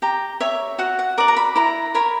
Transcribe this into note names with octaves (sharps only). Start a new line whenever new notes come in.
G4 A#5
C#5 E5
F#4 F#5
F#5
A#4 D5 D6
A#5
B5
E4 A#5
A#4 C#5 B5